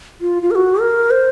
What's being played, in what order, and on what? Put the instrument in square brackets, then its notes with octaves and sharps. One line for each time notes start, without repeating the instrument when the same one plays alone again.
[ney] F4
F4
A#4
F#4
A#4
C5